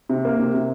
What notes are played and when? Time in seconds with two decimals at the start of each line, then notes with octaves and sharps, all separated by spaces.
0.09 C3
0.25 A#3
0.39 C3
0.54 C3